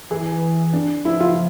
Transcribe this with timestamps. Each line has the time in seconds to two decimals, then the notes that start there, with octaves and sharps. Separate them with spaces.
0.10 E3 G#4
0.73 D4
1.05 F3 E4
1.20 F4